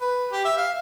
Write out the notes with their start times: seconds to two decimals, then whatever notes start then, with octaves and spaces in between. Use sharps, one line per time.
0.01 B4
0.31 G4
0.45 E5
0.57 F5